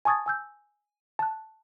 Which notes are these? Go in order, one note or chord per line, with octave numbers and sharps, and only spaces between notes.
G#5 A5 C#6 D#6 G#6 A6
G#5 E6 G6
A5 F#6